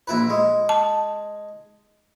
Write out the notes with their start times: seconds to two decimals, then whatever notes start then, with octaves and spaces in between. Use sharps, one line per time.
0.07 A#1 E4 B4
0.29 G#3
0.69 A5